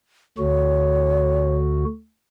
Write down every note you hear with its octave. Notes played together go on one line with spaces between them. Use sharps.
D2 D3 F#4 C#5